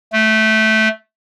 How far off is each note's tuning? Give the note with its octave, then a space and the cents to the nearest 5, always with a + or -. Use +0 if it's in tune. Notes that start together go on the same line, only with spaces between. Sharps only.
A3 -10